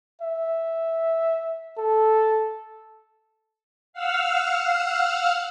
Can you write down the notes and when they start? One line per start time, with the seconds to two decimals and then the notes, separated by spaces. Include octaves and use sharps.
0.21 E5
1.78 A4
3.93 F5 F#5 E6 F6